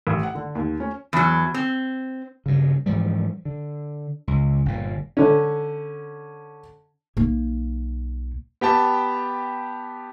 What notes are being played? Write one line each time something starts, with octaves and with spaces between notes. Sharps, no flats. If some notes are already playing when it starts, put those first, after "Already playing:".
A1
F#5
D3
D#2
C#4
E2 F#3
C4
G2 C#3
G#2 E3 F3 G3
D3
C#2
G1 A#2
D3 C#4
B1 A#3
B3 G4 G5 A5